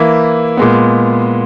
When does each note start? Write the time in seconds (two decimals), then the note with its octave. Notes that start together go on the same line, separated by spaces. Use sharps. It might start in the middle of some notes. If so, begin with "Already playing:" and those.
Already playing: E3 A#3 E4
0.57 A#2 G#3 B3